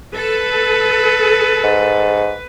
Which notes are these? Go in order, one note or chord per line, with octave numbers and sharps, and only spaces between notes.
A4 B4
G#2